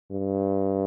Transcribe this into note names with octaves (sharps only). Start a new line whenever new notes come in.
G2